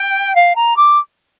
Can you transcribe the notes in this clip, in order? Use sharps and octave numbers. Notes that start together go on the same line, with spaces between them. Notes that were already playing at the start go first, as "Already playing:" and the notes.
Already playing: G5
F5
A#5
D6